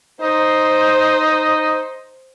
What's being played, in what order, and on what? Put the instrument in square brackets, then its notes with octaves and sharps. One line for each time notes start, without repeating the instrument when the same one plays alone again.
[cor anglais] D#4 [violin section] C5